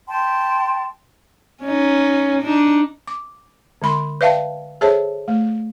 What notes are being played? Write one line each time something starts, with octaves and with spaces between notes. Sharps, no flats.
G5 A5 C6
C#4 D#4
D4 D#4
D6
D3 G#3 B5 C6
B4 D5 E5 F5 G5 A5
G#4 A4 C5 C#5 E5 A5
A3